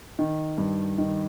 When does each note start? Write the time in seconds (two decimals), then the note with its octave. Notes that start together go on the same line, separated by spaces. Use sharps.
0.19 D#3
0.58 G2
0.98 D#3